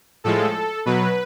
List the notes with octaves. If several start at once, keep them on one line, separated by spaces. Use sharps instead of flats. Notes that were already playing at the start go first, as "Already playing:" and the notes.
A2 F3 G#3 A4
B2 F#3 B4